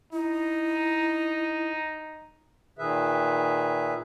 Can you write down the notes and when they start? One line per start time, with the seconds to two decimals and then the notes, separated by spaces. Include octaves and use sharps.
0.13 D#4 E4
2.79 A#2 D#3 G#4 B4 E5